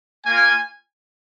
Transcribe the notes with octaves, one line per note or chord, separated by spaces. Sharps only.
A#3 F4 G#5